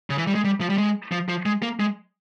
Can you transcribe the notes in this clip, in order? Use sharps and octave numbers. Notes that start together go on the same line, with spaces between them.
C#3
E3
G3
G#3
G3
F3
G3
G#3
F3
F3
G#3
A#3
G#3